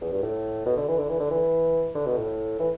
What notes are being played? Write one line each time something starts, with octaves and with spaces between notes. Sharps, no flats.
E2
G2
A2
B2
D3
E3
D3
E3
D3
E3
D3
B2
A2
E3